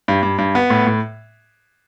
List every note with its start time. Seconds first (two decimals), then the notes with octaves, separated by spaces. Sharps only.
0.08 G2
0.23 G2
0.38 G2
0.55 B3
0.70 A2
0.86 A2